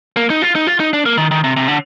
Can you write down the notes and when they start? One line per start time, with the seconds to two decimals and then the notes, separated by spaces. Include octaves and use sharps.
0.16 A#3
0.30 D#4
0.42 F4
0.55 D#4
0.67 F4
0.80 D#4
0.93 D4
1.06 A#3
1.18 D#3
1.31 D#3
1.44 C3
1.57 C3
1.68 D3